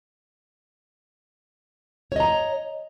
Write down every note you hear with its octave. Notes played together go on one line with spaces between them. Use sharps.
C#5 D#5 A#5